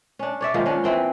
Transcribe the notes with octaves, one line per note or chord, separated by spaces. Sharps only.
C#4 D4
C#5 D5 E5
D#3 F3 G#3 A#3
C#4 D4
E3 C4 G5